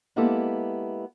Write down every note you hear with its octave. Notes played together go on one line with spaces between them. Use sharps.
G#3 A#3 B3 E4 G4 A4